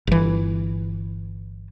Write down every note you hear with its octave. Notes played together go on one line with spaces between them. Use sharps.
G1 E3